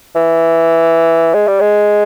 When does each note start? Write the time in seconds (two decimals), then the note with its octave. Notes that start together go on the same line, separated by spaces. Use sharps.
0.15 E3
1.34 G#3
1.48 G3
1.61 G#3